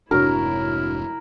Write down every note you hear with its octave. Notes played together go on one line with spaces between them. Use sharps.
F1 G#2 C3 D4 E4 F#4 A#4 C#5